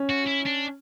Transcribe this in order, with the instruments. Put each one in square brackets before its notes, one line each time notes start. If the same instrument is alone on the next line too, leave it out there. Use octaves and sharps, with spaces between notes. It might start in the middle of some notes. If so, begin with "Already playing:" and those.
Already playing: [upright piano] C#4
[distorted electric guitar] F#4
E4
D4